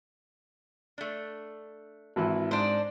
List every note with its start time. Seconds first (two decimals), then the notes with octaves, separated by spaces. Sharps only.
0.98 A3 D4
2.16 G#1 E3 E4
2.51 G#2 D4 C5